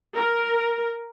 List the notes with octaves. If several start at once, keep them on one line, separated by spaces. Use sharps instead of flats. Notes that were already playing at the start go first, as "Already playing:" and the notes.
A#4